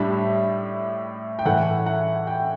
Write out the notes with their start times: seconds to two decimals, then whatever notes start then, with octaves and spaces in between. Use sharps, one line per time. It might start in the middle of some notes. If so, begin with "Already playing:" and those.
Already playing: A2 G3 D4 E5
1.39 G5
1.45 A2 E3 A3 F#5
1.86 F#5
2.27 G5